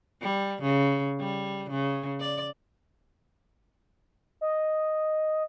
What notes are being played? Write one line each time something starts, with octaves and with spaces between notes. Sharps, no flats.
G3
C#3
G3
C#3
D5
D#5